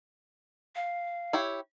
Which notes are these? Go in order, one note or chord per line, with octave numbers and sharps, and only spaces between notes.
F5
E4 G4 C#5